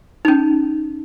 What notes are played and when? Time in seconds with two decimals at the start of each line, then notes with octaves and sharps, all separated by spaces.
0.25 C#4 D#4